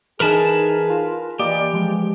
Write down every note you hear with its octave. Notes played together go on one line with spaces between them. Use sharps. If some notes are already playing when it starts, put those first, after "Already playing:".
E3 D#4 G#4 A#4 B4 A5
F4
E3 A#3 G4 D5 D#5
F3 G#3